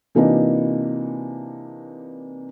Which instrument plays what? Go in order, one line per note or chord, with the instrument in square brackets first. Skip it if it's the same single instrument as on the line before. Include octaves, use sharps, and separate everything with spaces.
[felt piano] C3 E3 A#3 D4 D#4 F#4